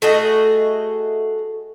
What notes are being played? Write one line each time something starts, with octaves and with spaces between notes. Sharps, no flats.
A3 F#4 G#4 D#5